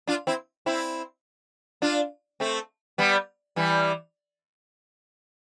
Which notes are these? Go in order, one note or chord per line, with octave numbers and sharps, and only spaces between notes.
D4 F4
C4 E4
C4 E4
D4 F4
A3 C4
G3 B3
E3 G3